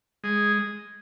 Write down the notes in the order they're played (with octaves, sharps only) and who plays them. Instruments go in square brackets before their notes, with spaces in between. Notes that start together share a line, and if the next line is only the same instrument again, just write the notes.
[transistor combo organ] G#3 G#4